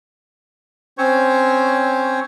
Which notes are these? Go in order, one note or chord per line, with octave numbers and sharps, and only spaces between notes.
C4 C#4 C5 C#5 C#6